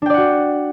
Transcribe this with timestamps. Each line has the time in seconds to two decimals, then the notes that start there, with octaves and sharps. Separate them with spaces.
0.02 D4
0.06 G5
0.10 D5
0.14 F#5
0.18 F#4